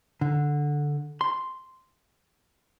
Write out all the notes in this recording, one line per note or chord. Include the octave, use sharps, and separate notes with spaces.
D3
C6